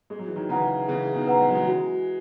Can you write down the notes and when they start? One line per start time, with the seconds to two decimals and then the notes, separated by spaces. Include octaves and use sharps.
0.10 G#3 G#4
0.19 F#3
0.27 E3
0.36 D#3 F#3
0.49 C#3 E3 B4 F#5 A#5
0.88 C#3 E3 G#4
1.14 B2 D#3
1.27 B4 F#5 A#5
1.41 G#3
1.49 F#3
1.55 E3 G#3
1.67 F#4